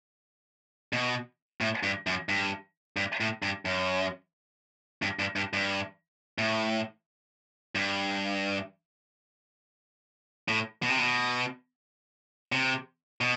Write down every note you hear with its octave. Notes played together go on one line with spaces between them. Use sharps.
B2
A2
G2
F#2
G2
G2
A2
G2
F#2
G2
G2
G2
G2
A2
G2
A2
B2
C3
B2
C3
B2